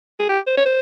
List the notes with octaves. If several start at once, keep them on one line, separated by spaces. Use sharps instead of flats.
G#4
G4
C5
C#5
C5